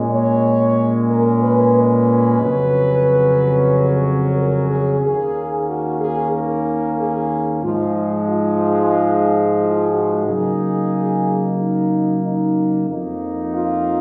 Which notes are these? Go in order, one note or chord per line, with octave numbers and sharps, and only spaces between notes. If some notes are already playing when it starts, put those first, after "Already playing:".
Already playing: A#2 G#3 C#4
C#5
A#4
B4
B4
F2 C#3 F#3 C#4
A#4
G#4
D#2 D#3 A#3 C#4 G#4
F#4
G#4
A#4
G#4
G#2 F3 G#3 F4
F4
F4
F#4
C#3 F#3 A#3 D#4 G#4
D#4
D#4
F2 F3 A#3 D#4
F4